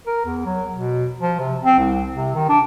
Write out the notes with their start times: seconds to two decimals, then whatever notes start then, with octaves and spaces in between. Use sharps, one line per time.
0.07 A#4
0.25 E2
0.46 F#3
0.73 B2
1.21 F3
1.39 C3
1.63 C4
1.79 C2
2.15 C3
2.35 D#3
2.49 D4